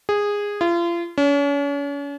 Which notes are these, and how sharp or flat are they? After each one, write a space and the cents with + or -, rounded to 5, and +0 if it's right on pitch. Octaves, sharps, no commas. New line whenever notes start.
G#4 -15
F4 -35
C#4 +40